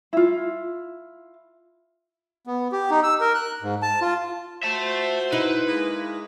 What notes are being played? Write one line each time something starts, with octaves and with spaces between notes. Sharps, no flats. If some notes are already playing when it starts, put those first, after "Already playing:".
E4 F4
B3
G4
D#4
E6
A#4
F#6
G#2
A5
F4
F4 F#4 C5 E5 A5
D#4 E4 B4
G#3 A#3